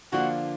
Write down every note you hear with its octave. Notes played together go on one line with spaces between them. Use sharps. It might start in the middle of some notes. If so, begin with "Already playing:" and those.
D3 F3 A#3 D4 F4 F#4